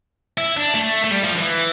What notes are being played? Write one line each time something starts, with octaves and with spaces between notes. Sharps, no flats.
E4
D4
A3
A3
G3
F3
E3